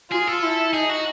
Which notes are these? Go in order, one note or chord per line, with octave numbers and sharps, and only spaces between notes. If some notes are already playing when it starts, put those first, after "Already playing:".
F4 G#4
A4
E4
D#4 G#4
F#4